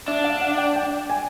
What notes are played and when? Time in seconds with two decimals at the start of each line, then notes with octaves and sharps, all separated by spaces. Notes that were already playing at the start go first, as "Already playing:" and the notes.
0.08 D4 E5
0.24 F5
0.41 F#5
0.58 G5
0.76 G5
1.10 G#5